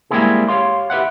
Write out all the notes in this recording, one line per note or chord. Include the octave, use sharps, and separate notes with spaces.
G3 G#3 A#3 C4 E4 G#4
G4 C#5 F5 C6
G4 B4 E5 F#5